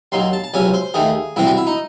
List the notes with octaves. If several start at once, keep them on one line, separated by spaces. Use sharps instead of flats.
D#2 D#3 F#3 C6
A5
A5
C#2 C3 F#3 C#4 G#5
C5
D#2 D#3 A3 G#4
C2 C3 E3 C4 E4
F#4
E4
D#4